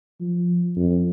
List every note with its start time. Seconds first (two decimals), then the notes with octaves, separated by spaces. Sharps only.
0.20 F3
0.77 F2